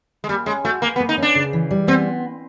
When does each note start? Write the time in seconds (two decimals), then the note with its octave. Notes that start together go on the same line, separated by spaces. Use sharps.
0.24 G#3
0.29 G3 A#3
0.46 G#3 C#4
0.64 A3 F#4
0.82 A#3 B4
0.96 B3
1.00 A#3
1.09 D#4
1.18 C#4 D4
1.35 C#3
1.53 E3
1.71 G3
1.87 B3 C4